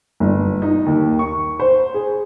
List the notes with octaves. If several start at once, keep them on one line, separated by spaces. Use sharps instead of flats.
G1
D#4
D#2
C#6
C5
G#4